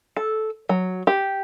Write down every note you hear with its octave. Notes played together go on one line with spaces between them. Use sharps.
A4
F#3
G4